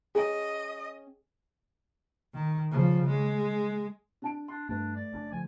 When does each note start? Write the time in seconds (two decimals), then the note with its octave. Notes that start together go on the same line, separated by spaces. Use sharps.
0.15 C#4 G#4 D#5 G5
2.34 D#3
2.71 C#3 F3
3.09 G#3
4.22 D4 A5 D7
4.48 D4 C6
4.69 G2 A3 D4 B4
4.96 D5
5.12 F#1 C#4 D4
5.32 D3 F3 G#5